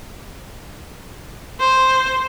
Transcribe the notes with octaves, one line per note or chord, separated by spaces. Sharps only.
C5